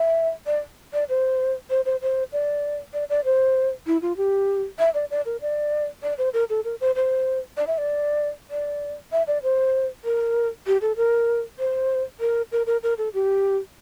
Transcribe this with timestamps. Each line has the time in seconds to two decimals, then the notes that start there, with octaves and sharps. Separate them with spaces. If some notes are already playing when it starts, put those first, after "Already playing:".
Already playing: E5
0.46 D5
0.93 D5
1.09 C5
1.70 C5
1.85 C5
2.02 C5
2.32 D5
2.93 D5
3.10 D5
3.25 C5
3.87 E4
4.02 F4
4.17 G4
4.79 E5
4.94 D5
5.11 D5
5.26 A#4
5.41 D5
6.03 D5
6.18 C5
6.33 A#4
6.50 A4
6.64 A#4
6.81 C5
6.96 C5
7.57 D5
7.67 E5
7.78 D5
8.50 D5
9.12 E5
9.27 D5
9.43 C5
10.05 A#4
10.66 G4
10.81 A4
10.97 A#4
11.59 C5
12.20 A#4
12.52 A#4
12.67 A#4
12.83 A#4
12.98 A4
13.14 G4